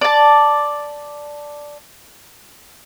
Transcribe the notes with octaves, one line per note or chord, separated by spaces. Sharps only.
D5 A5